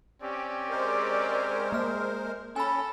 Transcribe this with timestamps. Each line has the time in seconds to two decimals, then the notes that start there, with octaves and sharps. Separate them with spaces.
0.22 C4 C#4 G4 D5
0.70 G#3 A#4 C5
1.72 A#3 F6
2.56 C#4 A4 G#5 B5